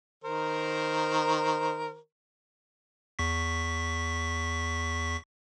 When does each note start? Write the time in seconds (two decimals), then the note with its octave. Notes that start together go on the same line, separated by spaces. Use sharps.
0.24 D#3 A#4 C5
3.19 E2 C#6 B6